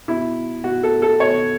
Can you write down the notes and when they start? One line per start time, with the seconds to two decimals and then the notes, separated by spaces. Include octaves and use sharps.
0.08 B2 E4
0.64 B2 F#4
0.83 A4
1.02 A4
1.20 B2 C#5